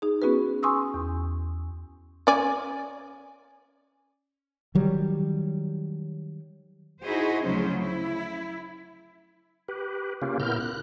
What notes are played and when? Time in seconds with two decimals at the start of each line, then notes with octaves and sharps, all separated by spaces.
0.02 D#4 G#4
0.22 B3 C#4 F#4 G#4 B4
0.63 G#5 C6 C#6 D#6 E6
0.94 E2
2.27 C#4 D5 G#5
4.75 D#3 F#3 G3
7.04 D#4 E4 F#4 G#4 C5
7.43 D2 C#3 F3 F#3 C#4 C5
7.82 E4
9.68 G4 B4
10.22 C#3 A#3 C#4 F4 G4
10.40 A#2 B3 E4 A#4 F6 G6
10.60 F#6